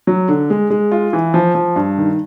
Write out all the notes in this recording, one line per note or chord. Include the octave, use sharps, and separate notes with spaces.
F#3
D3
G#3
G#3
F4
E3
F3
F3
G2
D#3